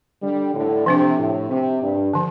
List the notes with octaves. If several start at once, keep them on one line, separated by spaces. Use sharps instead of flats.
D3 G3
A2 D3
C3 F3 D4 G4
A2
C3
G2
D3 F3